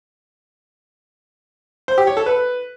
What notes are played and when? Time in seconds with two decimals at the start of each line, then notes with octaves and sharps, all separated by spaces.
1.88 C5
1.98 G4
2.07 C#5
2.17 A4
2.26 B4